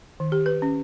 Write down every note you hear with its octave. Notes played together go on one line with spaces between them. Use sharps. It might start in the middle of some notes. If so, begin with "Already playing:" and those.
D#3
G4
B4
C#4